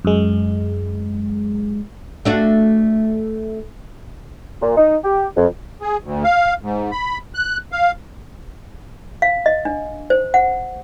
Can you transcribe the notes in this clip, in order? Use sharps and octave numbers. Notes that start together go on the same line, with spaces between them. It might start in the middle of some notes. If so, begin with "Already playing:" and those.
F#2 G#3
A3 D4 F#4
A#2
D#4
G4
F2
G#4
D2
F5
G#2
B5
F#6
F5
F5
D#5
D4
C5
F#5